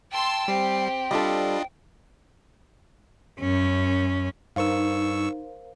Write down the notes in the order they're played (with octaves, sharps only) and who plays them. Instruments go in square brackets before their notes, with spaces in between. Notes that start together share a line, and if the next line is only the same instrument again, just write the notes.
[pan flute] G5 [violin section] A5 C6 E6
[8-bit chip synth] G3 C7 [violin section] C4 G4
[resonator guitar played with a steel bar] G3 A4 [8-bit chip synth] D4 F4 D#5
[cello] F#2 C#4
[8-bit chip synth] G2 C#6 E6 [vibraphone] D#4 [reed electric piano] A#4 C5 F5